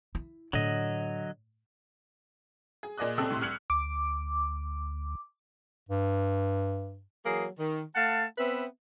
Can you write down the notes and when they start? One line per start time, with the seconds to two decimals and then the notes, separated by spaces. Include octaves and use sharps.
0.15 E4
0.53 A2 D3 F#3 D#5
2.83 G#4
2.98 A#2 G#4 D5 D#5 D#6 F#6
3.18 C#2 C3 C4 A4 E6 F#6
3.30 A2 C3 C6 F#6
3.41 C2 F6 G#6 C#7 F#7
3.70 D2 D6
5.89 G2
7.26 E3 F#3 A#3 G#4
7.59 D#3
7.96 A3 F5 F#5 A5
8.38 B3 C4 B4 E5